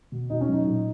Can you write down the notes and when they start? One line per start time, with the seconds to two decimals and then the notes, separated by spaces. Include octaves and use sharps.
0.12 B2
0.30 B2 D#4
0.41 C#4
0.49 F#3 D#4
0.67 A#2